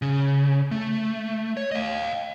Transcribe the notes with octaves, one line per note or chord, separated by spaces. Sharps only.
C#3
A3
C#5
D#5 F5